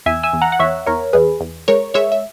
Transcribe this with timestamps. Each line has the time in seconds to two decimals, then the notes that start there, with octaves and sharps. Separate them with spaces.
0.06 E2 E5 G#5
0.23 E5 G#5
0.33 E2
0.42 F#5 A#5
0.52 F#5
0.59 E2 C#5 E5
0.86 E2 A#4 C#5
1.13 E2 G#4 B4
1.41 E2
1.68 G#3 A#4 C#5
1.94 G#3 C#5 E5
2.12 E5